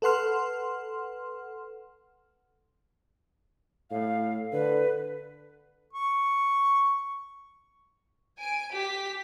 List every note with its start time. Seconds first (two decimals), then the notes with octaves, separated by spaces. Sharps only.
0.02 A4 B4 F#5 C6 F6
3.91 A2 F5
4.52 D3 B4
5.93 C#6
8.38 G#5 D7
8.72 G4 B6